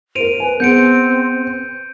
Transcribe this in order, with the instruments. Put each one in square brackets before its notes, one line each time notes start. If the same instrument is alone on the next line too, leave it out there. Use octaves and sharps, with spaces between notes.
[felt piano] A#4 C5 [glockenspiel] D7 D#7 F7
[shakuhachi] B4 [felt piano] G#5
[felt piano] B3 G#4 [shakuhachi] C4 [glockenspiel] G6 C#7 D7